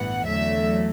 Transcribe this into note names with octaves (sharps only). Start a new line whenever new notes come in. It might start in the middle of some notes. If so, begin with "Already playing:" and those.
Already playing: A1 G2 E3 B3 F#5
E2 D3 F#3 A3 E5